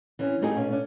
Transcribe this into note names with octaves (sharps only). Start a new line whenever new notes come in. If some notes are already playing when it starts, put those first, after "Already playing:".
E3 C4 C#4
G3 A3 C4 D#4 G4 G#4
B2 C#4 F4
A3 C#4 D4